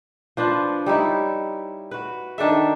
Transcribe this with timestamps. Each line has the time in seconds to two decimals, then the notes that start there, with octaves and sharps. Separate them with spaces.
0.37 F3 D4 B4 C5
0.86 G3 D#4 E4 C#5
1.91 F#4 B4
2.38 D#3 D4 A4 E5